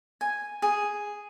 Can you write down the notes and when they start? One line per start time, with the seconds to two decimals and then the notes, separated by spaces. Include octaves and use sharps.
0.21 G#5
0.62 G#4